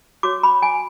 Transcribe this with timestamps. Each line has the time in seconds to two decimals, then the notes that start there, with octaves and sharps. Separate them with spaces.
0.23 F#4 C#5 D6
0.43 B5
0.62 G#5